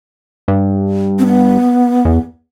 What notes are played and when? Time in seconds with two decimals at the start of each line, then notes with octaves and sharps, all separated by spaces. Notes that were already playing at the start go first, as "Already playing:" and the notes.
0.48 G2
1.19 C4
1.26 B3
2.05 E2